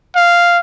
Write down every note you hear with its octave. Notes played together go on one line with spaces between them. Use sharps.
F5